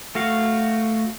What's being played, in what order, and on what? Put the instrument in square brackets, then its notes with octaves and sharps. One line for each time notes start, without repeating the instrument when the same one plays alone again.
[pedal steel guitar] A3 F#4 F5